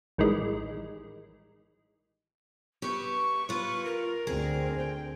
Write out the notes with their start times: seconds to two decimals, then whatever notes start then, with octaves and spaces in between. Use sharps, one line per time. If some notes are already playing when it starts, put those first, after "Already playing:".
0.18 A1 D#3 E3 G3 G#3
2.82 G4 B4 E5 C#6
3.49 F4 B4
3.84 A#4
4.27 D2 C4 G#4
4.77 G5